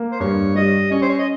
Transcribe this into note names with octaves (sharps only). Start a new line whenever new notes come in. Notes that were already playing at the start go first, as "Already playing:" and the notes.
Already playing: A#3
C5
G2 C#5
G3 D#5
C#4 C#5
C5
C#5
D#5